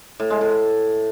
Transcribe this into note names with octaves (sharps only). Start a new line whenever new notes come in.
A2
G#3
A2